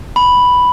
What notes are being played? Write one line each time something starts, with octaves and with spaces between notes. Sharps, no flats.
B5